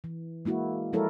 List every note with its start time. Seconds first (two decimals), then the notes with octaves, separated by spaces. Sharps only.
0.04 E3
0.45 G#3 A#3 E4 F#4
0.93 F3 G#3 E4 A4 A#4 C#5